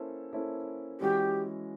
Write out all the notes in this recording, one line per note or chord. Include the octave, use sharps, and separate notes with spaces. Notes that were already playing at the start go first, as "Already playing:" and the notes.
Already playing: A#3 C#4 E4 A4 C5
A#3 C#4 E4 A4 C5
E3 G#3 C#4 F#4 G4